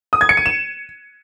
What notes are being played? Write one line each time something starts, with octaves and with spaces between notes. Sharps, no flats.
D#6
G#6
C#7
D#7
E7